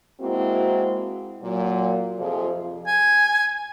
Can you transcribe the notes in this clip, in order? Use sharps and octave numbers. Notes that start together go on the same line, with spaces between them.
G#3 A#3 C4 E4 F#4
A#2 F#3
F2 C3 F3 F4 G#4
G#5